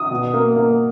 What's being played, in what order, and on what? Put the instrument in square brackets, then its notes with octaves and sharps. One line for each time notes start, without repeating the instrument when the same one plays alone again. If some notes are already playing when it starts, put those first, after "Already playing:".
Already playing: [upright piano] D#6
B2
A#3
A#3